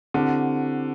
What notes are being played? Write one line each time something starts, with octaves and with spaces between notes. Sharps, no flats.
D3 C4 E4 G4 C5